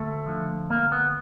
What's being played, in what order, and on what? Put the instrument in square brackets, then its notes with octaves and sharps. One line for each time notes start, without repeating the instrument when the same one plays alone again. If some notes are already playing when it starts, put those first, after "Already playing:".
Already playing: [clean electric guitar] D2 A3
D3 F3
D2 A#3
B3